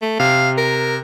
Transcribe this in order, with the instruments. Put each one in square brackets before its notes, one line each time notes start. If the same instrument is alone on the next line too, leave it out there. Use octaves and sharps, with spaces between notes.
[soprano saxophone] A3
[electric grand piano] C3 [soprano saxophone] F5
[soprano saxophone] A#4